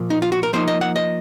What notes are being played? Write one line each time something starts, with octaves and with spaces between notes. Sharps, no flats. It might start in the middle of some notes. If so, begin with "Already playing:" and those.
Already playing: A#2 F3 A#3
D#4
F4
F#4
A#4
F3 A#3 D#4 C5
D#5
F#5
D#5